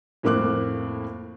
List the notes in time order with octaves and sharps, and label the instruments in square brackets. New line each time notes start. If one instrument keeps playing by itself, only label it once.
[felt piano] F2 A2 A#3 D6 F#6